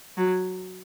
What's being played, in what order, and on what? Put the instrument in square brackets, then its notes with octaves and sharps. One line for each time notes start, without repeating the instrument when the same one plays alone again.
[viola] F#3